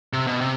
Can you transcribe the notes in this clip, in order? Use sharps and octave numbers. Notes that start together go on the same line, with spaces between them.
C3
B2
C3